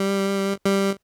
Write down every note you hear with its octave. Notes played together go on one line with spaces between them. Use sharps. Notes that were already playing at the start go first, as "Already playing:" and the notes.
Already playing: G3
G3